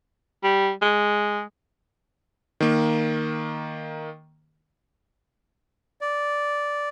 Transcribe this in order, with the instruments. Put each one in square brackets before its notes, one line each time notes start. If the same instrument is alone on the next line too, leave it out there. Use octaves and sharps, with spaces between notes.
[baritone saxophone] G3
G#3
[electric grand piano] D#3 A#3
[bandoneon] D5